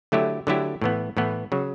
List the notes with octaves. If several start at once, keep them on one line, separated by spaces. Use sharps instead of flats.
D3 F#3 A3 E4 G4
D3 F#3 A3 E4 G4
A2 E3 B3
A2 E3 B3
C#3 F#3